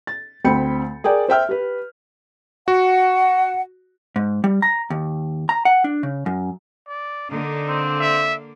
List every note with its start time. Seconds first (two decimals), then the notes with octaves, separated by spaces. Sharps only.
0.07 A6
0.45 D2 C4 G5 B5 C#7
1.04 G#4 A#4 D5 G5
1.28 C5 E5 G5 F6
1.49 G4 B4
2.68 F#4 F#5
4.16 G#2
4.44 G3
4.62 A#5
4.90 D#2
5.49 A#5
5.65 F#5
5.84 D4
6.03 C#3
6.26 F#2
6.88 D5
7.31 D3 A#3 D#4
7.68 C4
8.00 E5